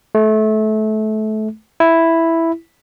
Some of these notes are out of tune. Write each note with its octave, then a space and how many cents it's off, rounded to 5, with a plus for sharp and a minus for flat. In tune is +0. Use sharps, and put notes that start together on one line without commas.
A3 -25
E4 +0